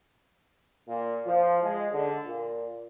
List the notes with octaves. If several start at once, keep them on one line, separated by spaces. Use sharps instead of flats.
A#2
F3
G#3
D3
A#2